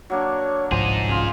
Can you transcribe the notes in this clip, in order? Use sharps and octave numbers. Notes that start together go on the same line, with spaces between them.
F#3 A#3 D4 C#5
G1 C2 G#2 F3 D#4 G#4 C5
C#3 F4